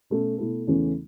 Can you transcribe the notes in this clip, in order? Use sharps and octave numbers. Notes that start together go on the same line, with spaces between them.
B2 A3 C#4 A4
B2 A3 E4 A4
E2 C#3 E3 A3 C#4